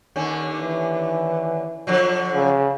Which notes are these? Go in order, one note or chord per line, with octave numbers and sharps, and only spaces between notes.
D#2 D3 C#4
E3
D3 F3 F#3
C#3